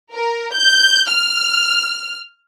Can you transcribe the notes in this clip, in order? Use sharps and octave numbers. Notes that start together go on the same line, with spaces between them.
A#4
G6
F6